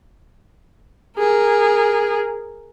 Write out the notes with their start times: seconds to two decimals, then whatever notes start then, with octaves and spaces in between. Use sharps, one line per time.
1.18 G#4 A#4